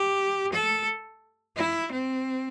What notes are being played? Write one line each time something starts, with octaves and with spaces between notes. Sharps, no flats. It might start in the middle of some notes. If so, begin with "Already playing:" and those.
Already playing: G4
A4
E4
C4